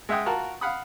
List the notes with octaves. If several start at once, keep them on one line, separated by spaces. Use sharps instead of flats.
G#3 E5 F#5 G5 D#6
F4 F#4 A#4 A5
F5 F#5 B5 D#6